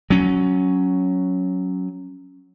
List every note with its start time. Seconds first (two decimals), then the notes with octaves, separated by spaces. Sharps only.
0.10 F#3 C#4